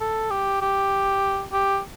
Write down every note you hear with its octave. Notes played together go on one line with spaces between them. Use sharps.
A4
G4
G4
G4